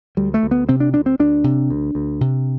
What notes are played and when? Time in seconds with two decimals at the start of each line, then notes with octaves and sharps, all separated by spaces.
0.17 D2 G3
0.34 A3
0.43 D2
0.51 B3
0.69 C3 C4
0.80 D4
0.93 D2 D4
1.06 C4
1.19 D2 D4
1.44 C3
1.70 D2
1.95 D2
2.21 C3